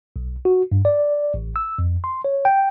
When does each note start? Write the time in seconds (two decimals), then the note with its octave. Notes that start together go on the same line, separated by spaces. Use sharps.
0.16 B1
0.45 F#4
0.72 G2
0.85 D5
1.34 A1
1.56 E6
1.78 F2
2.04 C6
2.25 C#5
2.45 G5